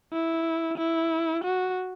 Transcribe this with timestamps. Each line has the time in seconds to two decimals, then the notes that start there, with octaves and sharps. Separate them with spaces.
0.13 E4
0.78 E4
1.44 F#4